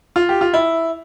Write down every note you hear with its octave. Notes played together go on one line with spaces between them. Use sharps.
F4
G4
F4
E4